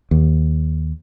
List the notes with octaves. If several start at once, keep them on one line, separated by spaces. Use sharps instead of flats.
D#2